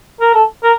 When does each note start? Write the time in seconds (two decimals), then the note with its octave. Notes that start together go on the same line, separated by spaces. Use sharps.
0.21 A#4
0.35 A4
0.64 A#4